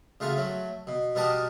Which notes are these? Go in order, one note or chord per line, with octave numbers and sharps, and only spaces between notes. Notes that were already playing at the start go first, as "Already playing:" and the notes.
C#3 A3 F4 F#4
F#3 A3
B2
B2 G3 A#4 F#5 A5 D#6